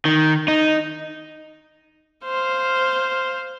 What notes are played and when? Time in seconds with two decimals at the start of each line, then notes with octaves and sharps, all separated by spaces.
0.05 D#3
0.48 D#4
2.25 C5 F5